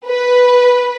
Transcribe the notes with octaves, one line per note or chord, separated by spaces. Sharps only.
B4